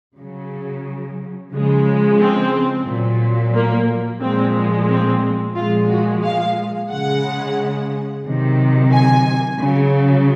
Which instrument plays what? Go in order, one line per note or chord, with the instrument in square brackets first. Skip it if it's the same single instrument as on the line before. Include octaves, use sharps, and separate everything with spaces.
[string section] C#3 F#3
C#3 F3 G#3
C4
A#2 F#3
A#3
A#2 F3 G#3 C4
C4
A#2 F3 G#3 F4
F#4
F5
C#3 G#3 F#5
C3 D#3 F#3
G#5
C#3 F#3